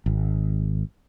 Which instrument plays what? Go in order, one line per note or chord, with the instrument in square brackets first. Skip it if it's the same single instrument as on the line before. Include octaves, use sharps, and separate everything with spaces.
[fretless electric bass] G#1